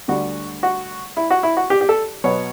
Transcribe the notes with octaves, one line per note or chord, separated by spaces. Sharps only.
D2 D3 G3 F#4
F#4
E4
F#4
E4
F#4
G4
G4
A4
B2 F#3 B3 C#5